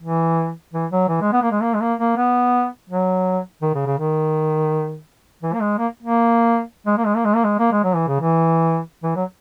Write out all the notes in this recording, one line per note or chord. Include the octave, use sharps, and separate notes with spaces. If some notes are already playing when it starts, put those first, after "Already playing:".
E3
E3
F#3
E3
G#3
B3
A#3
G#3
A#3
G#3
A#3
A#3
B3
F#3
D#3
C#3
C#3
D#3
E3
A#3
G#3
A#3
A#3
G#3
A#3
G#3
A#3
G#3
A#3
G#3
A#3
G#3
F#3
E3
C#3
E3
E3
F#3